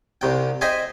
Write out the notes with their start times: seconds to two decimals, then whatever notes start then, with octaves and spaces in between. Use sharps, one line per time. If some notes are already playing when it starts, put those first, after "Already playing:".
0.21 C2 C3 G5
0.61 C5 D#5 E5 G5 G#5 C6